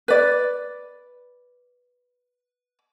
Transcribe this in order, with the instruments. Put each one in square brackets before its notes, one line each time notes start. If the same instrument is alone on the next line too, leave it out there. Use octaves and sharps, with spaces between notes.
[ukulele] B4 D5